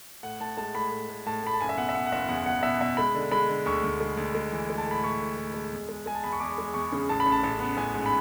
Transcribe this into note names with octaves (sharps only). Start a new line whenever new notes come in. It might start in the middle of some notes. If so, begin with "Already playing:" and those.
A2 F#5
A2 A5
G#3 A5
A2 B5
A2
A2
A2 A5
A2 B5
A5
F#1 G#5
E5
B2 F#5
E5
B2 F#5
F#5
F#1 E5
E2 F#5
E2 F#5
B2 E5
B2 E5
G#3 B5
D3
G#3 B5
D3
D2 C#6
D2
G#3
D2
G#3
E3
G#3
A5
A2 B5
A2 C#6
A2
A2
G#3
E2
G#3
G#3 G#5
A5
E2 B5
C#6
E2 D6
G#3
E2 C#6
C#3
A1 A5
B5
A1
A5
A1
B3
A1 G#5
G#2
B5